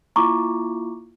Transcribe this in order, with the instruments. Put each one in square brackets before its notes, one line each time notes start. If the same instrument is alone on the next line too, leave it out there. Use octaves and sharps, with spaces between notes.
[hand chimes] A#3 E4 F4 [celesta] A#5 C#6 D6